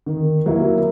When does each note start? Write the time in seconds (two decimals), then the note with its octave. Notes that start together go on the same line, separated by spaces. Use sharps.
0.06 D#3
0.46 F#3 A#3 E4